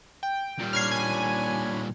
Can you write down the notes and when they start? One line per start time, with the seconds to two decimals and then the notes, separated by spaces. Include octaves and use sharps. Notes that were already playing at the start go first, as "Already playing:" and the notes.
0.23 G5
0.59 A#2 G3
0.73 D4 C#5 B5 F6 G#6 C7
0.91 G#5